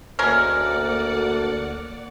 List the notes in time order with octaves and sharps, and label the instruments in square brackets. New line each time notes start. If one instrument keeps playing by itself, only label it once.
[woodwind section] D2 [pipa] G#3 C#4 A#4 [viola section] A#3 D5 F#5 [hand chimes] F6